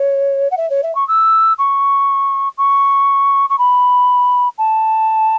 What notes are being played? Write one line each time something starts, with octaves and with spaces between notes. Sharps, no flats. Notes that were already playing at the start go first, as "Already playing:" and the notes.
Already playing: C#5
F#5
E5
C#5
E5
C#6
E6
C#6
C#6
C#6
B5
A5